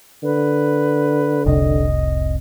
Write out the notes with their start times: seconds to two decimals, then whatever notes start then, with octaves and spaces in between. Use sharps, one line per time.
0.23 D3 B4
1.46 F1 C2 C3 D#5